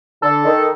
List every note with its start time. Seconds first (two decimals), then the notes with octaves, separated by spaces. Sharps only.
0.22 D3 A4
0.45 D#3